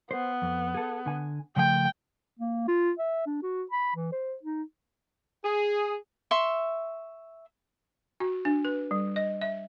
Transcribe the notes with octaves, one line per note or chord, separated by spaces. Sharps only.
B3 C5
F2
G#4 A4
D3 G#5
C#3 F3 A3 G5
A#3
F4
E5
D4
F#4
B5
E3
C5
D#4
G#4
E5 C6 C#6
F#4
D4
B4
G3
D#5
E5